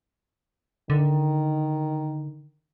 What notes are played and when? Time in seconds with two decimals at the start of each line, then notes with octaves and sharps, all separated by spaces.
0.90 D3 D#3